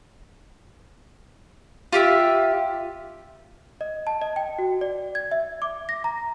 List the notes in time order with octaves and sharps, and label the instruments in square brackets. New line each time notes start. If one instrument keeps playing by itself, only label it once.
[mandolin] F4 G4 E5
[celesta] D#5
A5
D#5
G5
F#4
D5
G#6
E5
D6
A#6
A#5